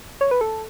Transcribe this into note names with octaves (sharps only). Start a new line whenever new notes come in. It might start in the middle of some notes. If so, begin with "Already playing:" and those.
C#5
B4
A4